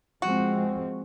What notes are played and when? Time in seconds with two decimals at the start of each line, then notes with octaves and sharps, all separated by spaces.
0.22 F3 G#3 C4 F#4